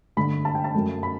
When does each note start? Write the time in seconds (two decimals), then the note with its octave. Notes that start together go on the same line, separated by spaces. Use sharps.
0.17 G2 D3 A3 B5
0.45 A5
0.55 G5
0.64 A5
0.74 F#2 F#3 A3
1.03 B5